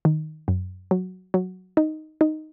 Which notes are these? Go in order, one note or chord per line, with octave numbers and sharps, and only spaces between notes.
D#3
F#2
F#3
F#3
D#4
D#4